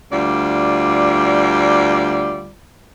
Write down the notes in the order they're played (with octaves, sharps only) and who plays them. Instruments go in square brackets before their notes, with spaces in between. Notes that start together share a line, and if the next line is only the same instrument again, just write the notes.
[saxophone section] D2 G3 F4 D5